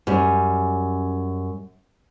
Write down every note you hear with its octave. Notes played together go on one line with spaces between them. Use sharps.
F#2 G3 C#4